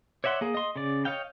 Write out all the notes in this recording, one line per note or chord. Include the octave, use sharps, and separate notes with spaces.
C#5 D5 E5 F#5 C6
A#3 G#4
D#5 C6
C#3 D5
C#5 D#5 F5 G5